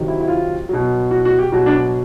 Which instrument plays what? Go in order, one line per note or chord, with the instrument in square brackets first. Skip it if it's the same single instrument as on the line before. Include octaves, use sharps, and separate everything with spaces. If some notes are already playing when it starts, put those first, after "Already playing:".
Already playing: [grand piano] C3 D#3 F#3
E4
E4
F4
B2 F#3
F#4
F#4
G4
B2 F#3 F#4
D4